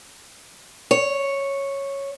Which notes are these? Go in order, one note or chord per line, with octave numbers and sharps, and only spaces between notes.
C#5